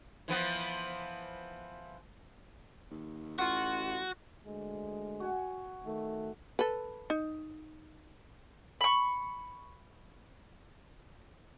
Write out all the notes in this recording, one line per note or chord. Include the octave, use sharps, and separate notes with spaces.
E3 F3 B3
D#2
A1 F4 F#4 F#5
D2 G#3
F#4 G#5
D#3 A3
A4 B4
D#4
B5 C#6